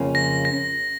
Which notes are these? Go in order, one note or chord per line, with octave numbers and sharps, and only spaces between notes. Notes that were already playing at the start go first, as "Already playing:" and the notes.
Already playing: F2 C#3 A#3 C#4 F4
A#6
A#6